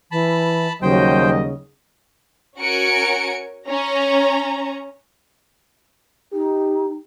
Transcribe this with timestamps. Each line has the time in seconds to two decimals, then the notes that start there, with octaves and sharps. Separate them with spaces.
0.11 E3 A5 B5
0.82 D#2 C#3 F#3 G3 C5 D#5 G5
2.58 C#4 F#4 A#4 G#5 C#7 D7
3.68 C#4 A#5
6.33 D#4 G4